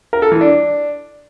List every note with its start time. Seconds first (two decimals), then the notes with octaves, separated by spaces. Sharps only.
0.13 A#4
0.22 A4
0.32 E3
0.41 D4